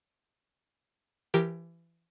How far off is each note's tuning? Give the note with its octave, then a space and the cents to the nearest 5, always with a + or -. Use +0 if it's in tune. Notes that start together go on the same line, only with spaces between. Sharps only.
E3 +30 G4 +0 A#4 +0